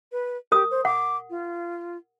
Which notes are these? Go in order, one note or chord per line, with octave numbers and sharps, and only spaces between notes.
B4
G4 A#4 D#6
C5
F#5 D6
F4